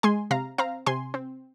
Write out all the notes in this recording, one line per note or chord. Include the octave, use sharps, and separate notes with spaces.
G#3 G#5 C6
C3 F5 A#5
C4 F5 A#5
C3 G#5 C6
C4